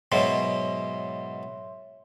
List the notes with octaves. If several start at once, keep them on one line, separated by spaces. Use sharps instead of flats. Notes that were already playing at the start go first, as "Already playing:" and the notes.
G#2 B2 F#3 C#5 E5 C6